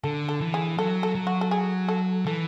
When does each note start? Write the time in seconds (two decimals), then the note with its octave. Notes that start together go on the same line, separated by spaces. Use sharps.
0.04 D3 A4
0.29 A4
0.41 E3
0.54 G#4
0.78 F#3 A4
1.03 A4
1.15 F#3
1.27 F#4
1.41 A4
1.51 G#4
1.88 A4
2.26 E3 A4